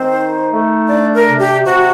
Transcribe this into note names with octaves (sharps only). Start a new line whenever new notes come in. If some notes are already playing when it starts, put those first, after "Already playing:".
Already playing: D#3 C4 C5
D#4
A3
D4 D5
A#4
C3
G4
C3 F#4